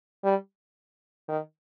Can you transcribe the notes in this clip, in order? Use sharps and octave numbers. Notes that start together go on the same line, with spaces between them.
G3
D#3